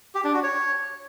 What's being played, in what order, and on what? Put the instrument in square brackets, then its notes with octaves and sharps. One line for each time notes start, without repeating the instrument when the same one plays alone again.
[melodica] G4
D4
F#4
C#5